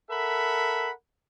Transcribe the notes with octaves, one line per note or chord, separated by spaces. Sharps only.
A4 A#4 E5 F#5 B5